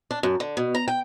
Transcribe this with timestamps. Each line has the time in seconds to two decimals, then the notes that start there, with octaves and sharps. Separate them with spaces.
0.11 D4
0.23 F#2
0.40 D3
0.57 B2
0.75 A#5
0.88 G5